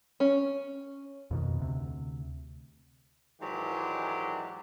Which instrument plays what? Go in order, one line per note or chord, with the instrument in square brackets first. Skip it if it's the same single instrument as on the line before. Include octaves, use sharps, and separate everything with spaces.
[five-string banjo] C#4
[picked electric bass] F2 B2 D#3
D2 C3
[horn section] G#2 D#3 E3 F#3 D4 G4